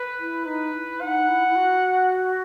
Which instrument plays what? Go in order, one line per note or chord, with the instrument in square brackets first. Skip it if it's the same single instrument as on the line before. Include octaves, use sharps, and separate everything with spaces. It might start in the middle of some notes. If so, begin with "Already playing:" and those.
Already playing: [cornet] B4
[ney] E4
[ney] D#4 [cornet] B4
[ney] E4
[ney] D#4 [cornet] F#5
[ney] E4
E4
F#4